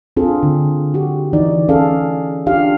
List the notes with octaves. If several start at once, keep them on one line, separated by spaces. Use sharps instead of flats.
C4 D4 F4 G#4 A4
D3
F#4 G4
E3 D#4 D5
C#4 G#4 A4 F5
D4 F4 G4 F5